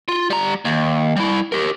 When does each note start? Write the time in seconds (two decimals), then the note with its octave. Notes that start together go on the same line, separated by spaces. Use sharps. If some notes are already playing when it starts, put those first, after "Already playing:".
0.08 F4
0.30 G3 A#5
0.65 D#2
1.16 G3 E4
1.52 G4 A#4